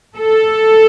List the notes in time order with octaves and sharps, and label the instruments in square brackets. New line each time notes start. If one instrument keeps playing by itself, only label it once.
[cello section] A4